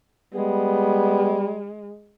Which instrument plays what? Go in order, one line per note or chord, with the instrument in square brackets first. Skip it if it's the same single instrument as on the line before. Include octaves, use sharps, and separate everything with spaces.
[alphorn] G3 [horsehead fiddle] G#3 [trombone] B3